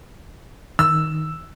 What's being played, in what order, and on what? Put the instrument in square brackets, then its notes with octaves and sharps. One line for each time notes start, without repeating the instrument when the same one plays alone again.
[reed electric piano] D#3 [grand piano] E6